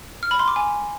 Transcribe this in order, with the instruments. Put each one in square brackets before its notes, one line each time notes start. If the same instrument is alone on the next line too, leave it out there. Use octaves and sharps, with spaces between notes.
[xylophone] F6
B5
C6
D6
G#5